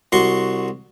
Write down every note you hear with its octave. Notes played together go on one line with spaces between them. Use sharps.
C2 F#4 C6 C#6